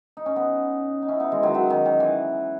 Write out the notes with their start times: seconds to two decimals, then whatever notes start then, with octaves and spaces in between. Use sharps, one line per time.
0.17 D#4
0.26 C#4
0.36 B3 D#4
1.02 D#4
1.08 C#4 E4
1.20 B3 D#4
1.32 E3 G#3
1.43 D#3 F#3
1.54 D#3 F#3
1.70 D#3
1.85 D#3
2.00 E3